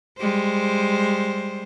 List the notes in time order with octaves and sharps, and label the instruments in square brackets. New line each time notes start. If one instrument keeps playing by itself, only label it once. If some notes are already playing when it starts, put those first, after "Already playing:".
[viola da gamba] G3 G#3 C5